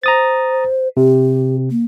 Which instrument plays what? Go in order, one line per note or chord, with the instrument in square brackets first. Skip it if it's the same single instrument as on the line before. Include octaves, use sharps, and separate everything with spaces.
[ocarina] C5 [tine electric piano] A#5 D#6 A6
[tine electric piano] C3 [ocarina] G4
[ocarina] A#3